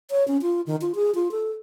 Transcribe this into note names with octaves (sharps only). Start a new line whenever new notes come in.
C#5
C#4
F4
D#3
F4
G#4
F4
A4